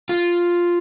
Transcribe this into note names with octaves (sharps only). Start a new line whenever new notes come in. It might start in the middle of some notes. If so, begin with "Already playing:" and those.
F4